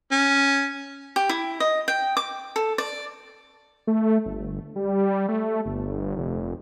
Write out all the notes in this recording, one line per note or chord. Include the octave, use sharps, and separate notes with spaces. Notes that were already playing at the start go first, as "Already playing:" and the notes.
C#4
G4
E4
D#5
G5
D6
A4
D5
A3
G1
G3
A3
G1
F1